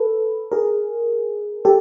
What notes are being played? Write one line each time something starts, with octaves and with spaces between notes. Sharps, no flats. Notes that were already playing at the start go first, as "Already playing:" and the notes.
Already playing: A4 B4
G#4 A#4
G4 A4